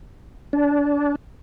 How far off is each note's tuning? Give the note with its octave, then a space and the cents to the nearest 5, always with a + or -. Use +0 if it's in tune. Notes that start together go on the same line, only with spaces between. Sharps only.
D4 -25